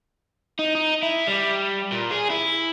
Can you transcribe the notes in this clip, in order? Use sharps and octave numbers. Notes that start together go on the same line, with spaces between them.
D#4
D#4
E4
G3
A#2
G#4
E4